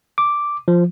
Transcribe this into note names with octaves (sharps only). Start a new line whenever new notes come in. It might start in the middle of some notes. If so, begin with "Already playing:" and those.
D6
F3